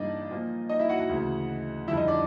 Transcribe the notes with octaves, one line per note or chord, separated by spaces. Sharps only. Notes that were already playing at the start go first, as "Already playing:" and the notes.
Already playing: G2 E3 G3 A#3 D4 D#4 D5 D#5
A#2 F3 A#3
D#4 D#5
E4 E5
F#4 F#5
F#4 F#5
D2 C#3 E3
F2 D3 G3 E4 E5
D#4 D#5
D4 D5